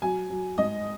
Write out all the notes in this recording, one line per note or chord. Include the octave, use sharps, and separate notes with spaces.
F#3 G#5
F#3
G#2 D#5